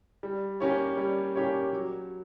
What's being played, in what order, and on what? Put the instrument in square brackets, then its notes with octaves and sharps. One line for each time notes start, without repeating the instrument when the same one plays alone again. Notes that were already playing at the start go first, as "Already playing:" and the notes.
[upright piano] G3
A#3 C#4 G4 C#5
G3
A#3 C#4 G4 C#5
F#3